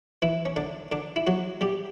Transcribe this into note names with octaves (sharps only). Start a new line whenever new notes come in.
E3 E4
C#4
D3 D4
D3 D4
E4
F#3 F#4
G3 G4